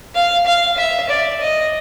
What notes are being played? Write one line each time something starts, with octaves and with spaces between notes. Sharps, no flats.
F5
F5
E5
D5
D#5